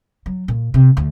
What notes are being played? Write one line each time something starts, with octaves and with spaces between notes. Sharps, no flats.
F#3
A#2
C3
D2